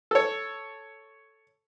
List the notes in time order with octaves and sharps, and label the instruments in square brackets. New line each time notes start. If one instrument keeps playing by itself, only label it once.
[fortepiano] A4 C#5